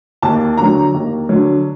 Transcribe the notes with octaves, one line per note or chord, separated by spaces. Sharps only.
D#2 A5
D3 F#3 A#5
D#2
D3 F#3